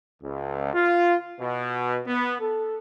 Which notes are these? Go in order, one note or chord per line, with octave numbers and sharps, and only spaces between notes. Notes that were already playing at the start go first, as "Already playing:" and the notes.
C#2
F4
B2
B3
A4